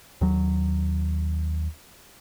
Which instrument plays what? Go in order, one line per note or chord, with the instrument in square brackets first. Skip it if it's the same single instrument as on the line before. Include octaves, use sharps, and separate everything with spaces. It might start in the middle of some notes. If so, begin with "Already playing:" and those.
[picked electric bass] D#2 F#3